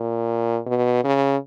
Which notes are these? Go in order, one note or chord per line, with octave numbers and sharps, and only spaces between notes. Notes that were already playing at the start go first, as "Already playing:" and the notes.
Already playing: A#2
B2
C#3